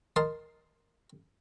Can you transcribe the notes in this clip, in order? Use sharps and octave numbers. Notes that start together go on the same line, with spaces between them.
A#4 D#5 A5 C6